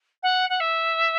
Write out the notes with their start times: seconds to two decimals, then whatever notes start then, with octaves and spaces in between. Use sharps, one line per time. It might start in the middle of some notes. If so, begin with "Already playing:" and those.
0.23 F#5
0.49 F#5
0.60 E5